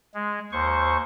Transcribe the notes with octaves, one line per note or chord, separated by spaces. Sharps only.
G#3
D#2 C5 C#6